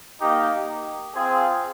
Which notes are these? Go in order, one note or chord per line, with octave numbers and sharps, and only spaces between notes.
A#3 D#4 G4
C4 F4 G#4